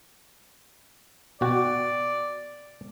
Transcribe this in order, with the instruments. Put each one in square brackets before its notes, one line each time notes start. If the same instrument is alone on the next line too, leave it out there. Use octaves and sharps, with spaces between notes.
[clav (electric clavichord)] B2 F#4 G5 [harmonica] D5